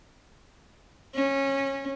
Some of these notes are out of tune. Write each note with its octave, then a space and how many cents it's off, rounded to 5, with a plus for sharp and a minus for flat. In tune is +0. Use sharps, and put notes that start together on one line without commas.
C#4 -20